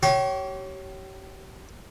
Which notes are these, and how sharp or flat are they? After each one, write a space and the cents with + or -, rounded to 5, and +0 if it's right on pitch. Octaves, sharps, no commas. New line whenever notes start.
G4 -35 C#5 +0 C6 +35